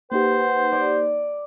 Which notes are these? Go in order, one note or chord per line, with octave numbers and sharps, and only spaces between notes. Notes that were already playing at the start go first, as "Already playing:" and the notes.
A#3 D#4 G4 B4 C5 F#5
D5